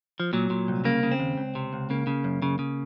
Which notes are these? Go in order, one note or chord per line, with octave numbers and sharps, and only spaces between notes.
F3
A#2 F#3
A#2
C2
C#3 A#3
C#3
C4
D#2
C#2
C3
C#2
C#3 A#3
C#3
F#2
C#3
C#3